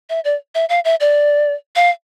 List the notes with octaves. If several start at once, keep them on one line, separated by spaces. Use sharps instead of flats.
E5
D5
E5
F5
E5
D5
F5